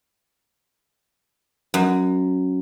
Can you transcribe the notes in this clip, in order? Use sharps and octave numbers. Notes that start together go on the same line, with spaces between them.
F#2